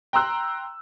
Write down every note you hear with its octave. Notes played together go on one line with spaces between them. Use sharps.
G5 A#5 C6 E6 F#6